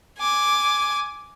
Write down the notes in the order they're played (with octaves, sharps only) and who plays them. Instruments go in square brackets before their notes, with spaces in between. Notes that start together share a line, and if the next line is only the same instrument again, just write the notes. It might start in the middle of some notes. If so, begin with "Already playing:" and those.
[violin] G#5 D6